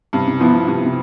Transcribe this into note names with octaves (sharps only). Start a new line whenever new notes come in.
G2 C3
C3
B2 F3 B3 E4
B2
G2 C3
C3